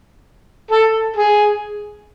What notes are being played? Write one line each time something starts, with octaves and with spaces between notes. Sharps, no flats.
A4
G#4